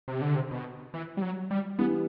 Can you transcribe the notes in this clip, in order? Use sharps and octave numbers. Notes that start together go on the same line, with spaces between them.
C3
D3
C3
B2
E3
G3
F#3
G3
E3 G3 B3